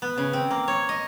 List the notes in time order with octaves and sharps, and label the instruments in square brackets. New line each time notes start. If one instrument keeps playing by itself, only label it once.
[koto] B3
C#3
C4
A#3
C#5
D#5